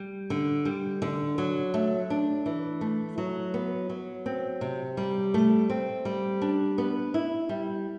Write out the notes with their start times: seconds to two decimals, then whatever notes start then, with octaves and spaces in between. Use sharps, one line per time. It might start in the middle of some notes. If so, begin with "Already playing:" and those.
Already playing: G3
0.30 D3
0.65 G3
1.02 D3
1.38 F#3
1.74 A3
2.10 D4
2.46 E3
2.81 A3
3.18 F#3
3.54 B3
3.89 F#3
4.26 C4
4.61 C3
4.97 G3
5.34 A3
5.70 C4
6.05 G3
6.42 D4
6.78 B3
7.14 E4
7.49 G3